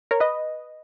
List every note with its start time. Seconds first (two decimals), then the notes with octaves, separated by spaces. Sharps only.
0.11 A#4 C#5
0.20 B4 D#5